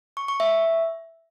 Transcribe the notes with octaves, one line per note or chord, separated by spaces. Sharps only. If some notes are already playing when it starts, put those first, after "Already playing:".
C#6
C#6
E5